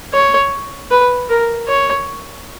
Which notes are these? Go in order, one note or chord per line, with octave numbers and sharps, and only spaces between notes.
C#5
B4
A#4
C#5